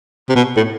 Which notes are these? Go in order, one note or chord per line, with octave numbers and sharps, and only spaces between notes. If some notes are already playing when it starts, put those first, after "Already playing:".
C3
B2
A2